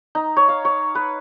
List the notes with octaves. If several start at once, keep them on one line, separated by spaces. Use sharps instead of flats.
D#4
C#5
F5
C#5
B4